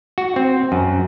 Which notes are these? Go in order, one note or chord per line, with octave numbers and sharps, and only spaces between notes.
F#4
C4
F#2